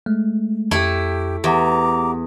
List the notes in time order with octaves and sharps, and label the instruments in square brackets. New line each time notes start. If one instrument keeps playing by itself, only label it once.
[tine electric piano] G#3 A3
[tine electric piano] F2 [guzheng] A3 E4 [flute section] G4
[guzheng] E2 [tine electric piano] G4 E5 F#5 [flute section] A#5 D6